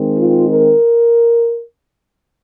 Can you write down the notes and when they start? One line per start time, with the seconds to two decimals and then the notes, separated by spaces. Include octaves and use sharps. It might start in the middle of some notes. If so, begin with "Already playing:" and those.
Already playing: D#3 G#3 C4
0.18 F4
0.50 A#4